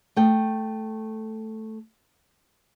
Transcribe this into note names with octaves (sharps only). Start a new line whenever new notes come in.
A3 G5